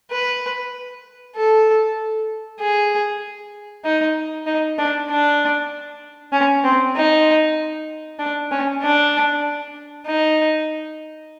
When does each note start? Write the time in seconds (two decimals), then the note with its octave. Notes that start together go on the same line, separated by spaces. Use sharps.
0.11 B4
1.36 A4
2.60 G#4
3.85 D#4
4.47 D#4
4.78 D4
5.09 D4
6.33 C#4
6.64 C4
6.96 D#4
8.19 D4
8.51 C#4
8.82 D4
10.07 D#4